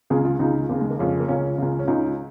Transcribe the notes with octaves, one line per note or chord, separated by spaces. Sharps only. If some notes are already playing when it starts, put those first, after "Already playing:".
C#2 C#3 G#4
F4
C#2 C#3 D#4
D#2 C#3
G#3
A#3
F2 C#3 C#4
A#3
C#2 C#3 C#4
C#2 C#3
C#4
C#2 C#3 D#4